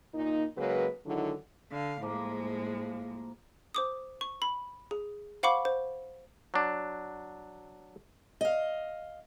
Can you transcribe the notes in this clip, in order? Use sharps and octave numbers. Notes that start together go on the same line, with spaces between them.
A#2 D#4
C#3 F#3 G#3 A#3 B4
D3 D#3 F#3 G#3 D4 E4
D3 F5
A2 F3 G#3 A#3
C5 D6 D#6
C#6
B5
G#4
C5 F5 F#5 B5 C#6 D6
C5
F#3 D4
D#5 F5